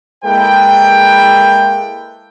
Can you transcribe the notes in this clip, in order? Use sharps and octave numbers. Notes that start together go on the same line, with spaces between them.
G#3 A#3 E4 A4 B4 G5